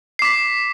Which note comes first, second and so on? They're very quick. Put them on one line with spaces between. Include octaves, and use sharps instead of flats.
C7 D6 B6